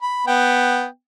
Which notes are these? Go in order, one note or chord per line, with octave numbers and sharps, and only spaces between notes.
B5
B3 G5